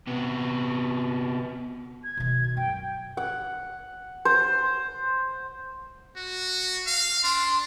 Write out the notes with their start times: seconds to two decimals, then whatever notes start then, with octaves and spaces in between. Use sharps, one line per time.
0.07 C3 B3
2.04 G#6
2.17 B2 D#3
2.57 F#2 G5
3.17 F#5
4.25 C5
6.16 F#4
6.86 F5
7.24 D4 C6